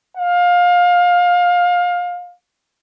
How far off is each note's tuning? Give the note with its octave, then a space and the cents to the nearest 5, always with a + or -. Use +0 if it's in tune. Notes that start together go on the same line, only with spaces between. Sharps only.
F5 +25